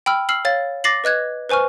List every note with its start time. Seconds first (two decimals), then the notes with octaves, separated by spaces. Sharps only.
0.06 G5 B5 E6 F6
0.29 E6 F6 C7 F#7
0.45 C#5 F5 A6
0.84 D6 A6 A#6 C7 F#7
1.04 B4 D#5 F#6 G#6
1.49 B4 C5 G#5 C#6 F6